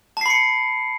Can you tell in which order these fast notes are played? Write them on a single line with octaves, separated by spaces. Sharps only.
A5 C7 B5 C#7